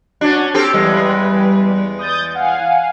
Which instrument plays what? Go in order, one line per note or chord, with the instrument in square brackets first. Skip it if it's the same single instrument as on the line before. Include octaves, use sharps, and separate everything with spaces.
[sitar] C#4 D4 [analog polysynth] F#4
[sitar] C4 G4 A4 [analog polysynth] F6 G#6 D7
[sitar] E2 G#3 [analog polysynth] G3 B4
[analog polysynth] D#6 G6 A6
F5 F#5 G#5